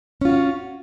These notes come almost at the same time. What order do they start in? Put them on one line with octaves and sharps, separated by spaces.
C#4 F4 F#4